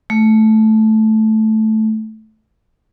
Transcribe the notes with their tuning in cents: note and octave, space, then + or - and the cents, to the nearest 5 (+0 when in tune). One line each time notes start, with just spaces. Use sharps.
A3 -10